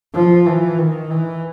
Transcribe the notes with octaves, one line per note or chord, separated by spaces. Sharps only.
F3
E3
D#3
E3